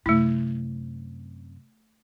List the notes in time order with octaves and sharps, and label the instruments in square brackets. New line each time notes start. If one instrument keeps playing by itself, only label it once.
[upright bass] F#2 C3 [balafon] A3 E4